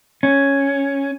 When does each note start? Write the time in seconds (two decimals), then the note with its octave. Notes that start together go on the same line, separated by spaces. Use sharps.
0.23 C#4